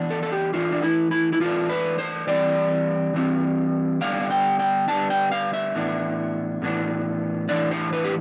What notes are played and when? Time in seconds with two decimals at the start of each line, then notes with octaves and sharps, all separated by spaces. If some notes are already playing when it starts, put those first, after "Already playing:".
Already playing: E3 B3 D4
0.10 A4
0.23 A4
0.32 G4
0.54 E3 A3 D4 F4
0.72 D4
0.82 E4
1.11 E4
1.33 E4
1.40 E3 A3 D4 F4
1.70 B4
1.99 C5
2.27 E3 G3 C4 D5
3.14 E3 G3 C4
4.01 D3 G3 B3 D4 F5
4.30 G5
4.59 G5
4.88 D3 G3 B3 D4 A5
5.10 G5
5.32 F5
5.53 E5
5.75 A2 E3 B3 D4
6.62 A2 E3 B3 D4
7.49 A2 E3 B3 D4 D5
7.71 C5
7.93 B4
8.05 G4